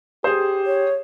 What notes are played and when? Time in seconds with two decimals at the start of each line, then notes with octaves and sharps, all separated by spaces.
0.24 G4 G#4 C5
0.66 C#5